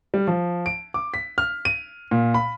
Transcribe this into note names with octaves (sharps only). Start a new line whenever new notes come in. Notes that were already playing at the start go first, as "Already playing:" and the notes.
G3
F3
D7
D6
B6
F6
D#7
A#2
B5